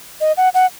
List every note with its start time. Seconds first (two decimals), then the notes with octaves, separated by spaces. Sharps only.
0.21 D#5
0.37 F#5
0.54 F#5